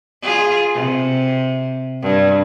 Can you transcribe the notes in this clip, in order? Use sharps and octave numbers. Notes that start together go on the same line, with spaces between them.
F4 G#4
C3
G2